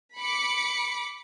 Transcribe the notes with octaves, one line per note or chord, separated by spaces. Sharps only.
B5 D6 C#7